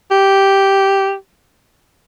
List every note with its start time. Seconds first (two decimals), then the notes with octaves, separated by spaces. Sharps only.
0.11 G4